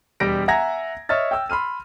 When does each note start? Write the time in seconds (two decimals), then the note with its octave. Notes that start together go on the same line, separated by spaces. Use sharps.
0.20 E1 G3 G4 A#6 D7
0.48 E5 F#5 G#5 A#5 G#6 A#6
1.09 C#5 D#5 E5 F6 A6
1.31 G5 E6
1.50 B5 C6 F6 D#7